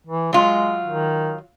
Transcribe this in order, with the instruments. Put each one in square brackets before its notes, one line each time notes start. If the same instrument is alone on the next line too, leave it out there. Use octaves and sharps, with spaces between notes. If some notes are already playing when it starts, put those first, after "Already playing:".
[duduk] E3
[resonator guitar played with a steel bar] F#3 F4 [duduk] G#3
[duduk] D#3